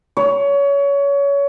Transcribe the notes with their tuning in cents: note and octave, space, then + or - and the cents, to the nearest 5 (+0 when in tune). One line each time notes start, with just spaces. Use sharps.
C#5 +25